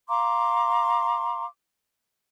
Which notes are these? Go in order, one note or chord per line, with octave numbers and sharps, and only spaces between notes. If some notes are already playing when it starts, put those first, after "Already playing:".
F5 A#5 C6 D6